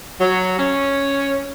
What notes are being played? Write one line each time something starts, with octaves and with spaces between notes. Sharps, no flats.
F#3
C#4